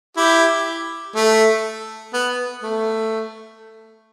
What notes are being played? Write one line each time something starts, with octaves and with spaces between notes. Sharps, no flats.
E4 G4
A3
B3
A3